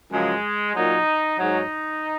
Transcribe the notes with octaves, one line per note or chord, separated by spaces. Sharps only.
F#2 C#3 F3 G#3
A#2 F#3 D#4
G#2 F#3 D#4